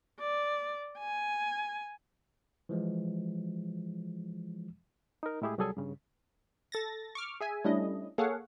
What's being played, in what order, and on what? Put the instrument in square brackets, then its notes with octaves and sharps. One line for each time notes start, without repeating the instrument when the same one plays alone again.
[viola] D5
G#5
[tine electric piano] E3 F3 G#3
[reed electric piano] D#4 A#4
A2 G#3 E4 G4 G#4
C2 F#3 G3 G#4 A4 G#5
G2 C#3
[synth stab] A4 A6 A#6
C#6 D6 F6
G#4 E5 G#5
G3 A3 C#4 D4 E4 D#5
A#3 G#4 A4 C#5 F5 F#5